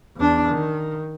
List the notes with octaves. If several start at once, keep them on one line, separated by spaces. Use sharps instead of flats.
E2 D4
D#3